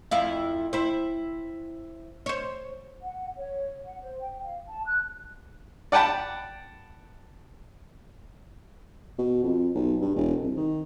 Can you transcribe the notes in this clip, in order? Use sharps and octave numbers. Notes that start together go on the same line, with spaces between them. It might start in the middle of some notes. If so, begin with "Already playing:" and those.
F2 E4 F5
E4 C5
C5 C#5
F#5
C#5
F#5
C5
G5
F5
A5
F#6
D5 F#5 G5 A5 B5
B2
F2
B1
G2
E1
C2
D#3